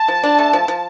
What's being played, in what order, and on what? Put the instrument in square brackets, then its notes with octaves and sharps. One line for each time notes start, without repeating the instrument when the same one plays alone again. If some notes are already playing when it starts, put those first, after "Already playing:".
Already playing: [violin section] A5
[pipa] F3
D4
A3
F3
F3